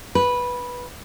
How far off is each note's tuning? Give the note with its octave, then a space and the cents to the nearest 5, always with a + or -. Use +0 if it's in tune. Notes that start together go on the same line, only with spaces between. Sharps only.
B4 -10